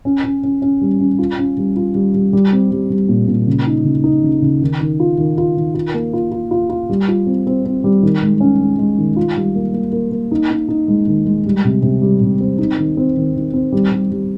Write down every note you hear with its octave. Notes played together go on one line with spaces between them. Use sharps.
C#4
C#4
C#4
C#4
G3
C#4
F4
C#4
G3
F4
G3
G3
G3
C4
G3
G3
A#2
A#2
C#3
D#4
C#3
D#4
C#3
C#3
D#3
D#3
F4
D#3
F4
D#3
F4
A#3
F4
F4
F4
F4
G3
F4
C4
C4
C4
G3
D#3
G#3
C#4
G#3
G#3
D#3
F4
G3
A#3
A#3
A#3
A#3
D#4
D#4
D#4
G#3
D#3
G#3
G3
C3
C3
G3
C3
C4
D#4
D#3
C4
D#3
D#3
C4
G3
G3
G3